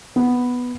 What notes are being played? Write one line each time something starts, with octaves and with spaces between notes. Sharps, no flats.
B3